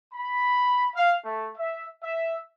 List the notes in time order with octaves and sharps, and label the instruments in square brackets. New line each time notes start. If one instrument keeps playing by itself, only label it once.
[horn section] B5
F5
A3
E5
E5